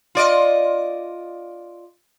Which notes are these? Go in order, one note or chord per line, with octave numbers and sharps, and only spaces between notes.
F4 D5 D#5